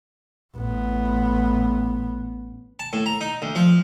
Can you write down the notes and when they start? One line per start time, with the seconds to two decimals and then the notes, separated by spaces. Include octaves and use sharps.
0.56 A1 B3
2.79 A5
2.93 A2
3.06 A#5
3.21 D#4
3.42 D2
3.55 F3